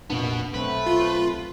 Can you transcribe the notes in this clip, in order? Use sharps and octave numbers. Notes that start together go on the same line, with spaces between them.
F1 A#2 B3 D4 F#4
B1 A3 C4 B4
F4